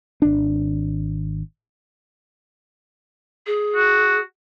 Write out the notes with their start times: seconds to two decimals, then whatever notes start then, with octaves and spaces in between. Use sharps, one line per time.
0.22 G#1 D4
3.47 G#4
3.75 F#4